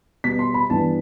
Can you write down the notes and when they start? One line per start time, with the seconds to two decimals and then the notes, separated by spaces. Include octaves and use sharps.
0.24 B2 G3 B3 B6
0.39 C6
0.54 B5
0.70 G2 E3 B3 D4 A5